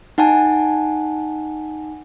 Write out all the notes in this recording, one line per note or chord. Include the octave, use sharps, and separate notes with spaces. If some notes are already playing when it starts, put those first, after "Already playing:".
D#4 F#5 G#5 A5